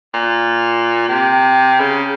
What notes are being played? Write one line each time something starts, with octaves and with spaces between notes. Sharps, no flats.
A#2
C3
C#3